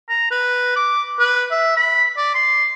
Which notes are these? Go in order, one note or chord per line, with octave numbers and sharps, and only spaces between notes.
A#5
B4
D6
B4
E5
B5
D5
C6